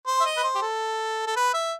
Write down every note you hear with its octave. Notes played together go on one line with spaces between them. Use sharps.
C5
E5
D#5
B4
C5
G4
A4
A4
B4
E5